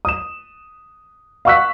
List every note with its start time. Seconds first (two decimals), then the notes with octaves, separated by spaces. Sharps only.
0.05 D#6 E7
1.45 F5 F#5 C#6 E6 F#6 B6